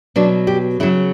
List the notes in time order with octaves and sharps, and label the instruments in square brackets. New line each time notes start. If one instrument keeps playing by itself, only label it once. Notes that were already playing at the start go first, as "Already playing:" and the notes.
[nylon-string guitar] B2 F#3 D4
G4
C#3 F#3 E4